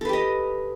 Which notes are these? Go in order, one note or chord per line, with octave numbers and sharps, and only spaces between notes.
G4 A4 B4 D#5